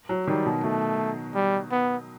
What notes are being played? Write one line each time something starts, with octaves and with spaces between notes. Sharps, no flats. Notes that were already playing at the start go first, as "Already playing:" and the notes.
F#3
D#3 G3
B2
B2 A3
G3
B3